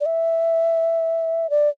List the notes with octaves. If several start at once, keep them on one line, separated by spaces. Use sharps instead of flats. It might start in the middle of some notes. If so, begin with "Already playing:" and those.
D5
E5
D5